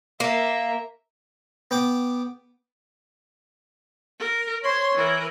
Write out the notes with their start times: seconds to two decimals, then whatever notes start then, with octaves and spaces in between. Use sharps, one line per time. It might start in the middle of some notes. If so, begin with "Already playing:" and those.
0.20 A#3 A#4 E5
1.71 B3 G5 D6
4.19 A#4
4.64 C5 C#5 C6
4.95 E3 A#4